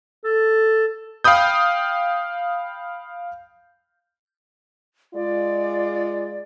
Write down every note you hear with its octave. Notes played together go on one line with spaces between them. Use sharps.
A4
F5 G5 B5 D#6 G6
G#3 F4 D5